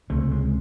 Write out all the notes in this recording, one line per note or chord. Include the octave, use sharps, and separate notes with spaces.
C#2 C3 A3
G#3